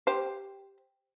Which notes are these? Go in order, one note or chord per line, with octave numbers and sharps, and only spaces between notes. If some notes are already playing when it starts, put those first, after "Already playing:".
G4 C5